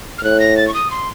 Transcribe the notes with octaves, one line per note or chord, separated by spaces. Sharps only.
F6
A2 F#6
A#6
A6
C#6
D#6
C6